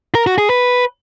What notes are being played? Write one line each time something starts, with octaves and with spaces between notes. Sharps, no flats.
A#4
F#4
G#4
B4